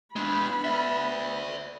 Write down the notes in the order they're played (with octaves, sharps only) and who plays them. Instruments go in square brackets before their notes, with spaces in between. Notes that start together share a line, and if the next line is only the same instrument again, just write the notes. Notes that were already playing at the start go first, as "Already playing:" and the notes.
[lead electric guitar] G#3 D4 [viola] B3 B5
[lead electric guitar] D5 E5